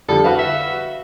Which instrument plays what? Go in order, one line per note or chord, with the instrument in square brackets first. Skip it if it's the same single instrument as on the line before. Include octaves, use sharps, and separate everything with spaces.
[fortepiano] F2 D3 G3 [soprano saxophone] A4
[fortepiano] F#4 B4 F5
[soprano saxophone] E5